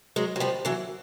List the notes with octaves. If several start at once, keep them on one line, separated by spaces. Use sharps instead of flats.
F#3 G#3
F#3
F3 G3
E3 F#3